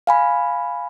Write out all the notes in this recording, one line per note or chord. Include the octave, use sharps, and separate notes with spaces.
F5 G#5 B5